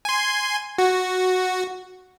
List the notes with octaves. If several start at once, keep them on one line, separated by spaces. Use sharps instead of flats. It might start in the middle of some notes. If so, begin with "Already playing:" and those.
G#5 C6
F#4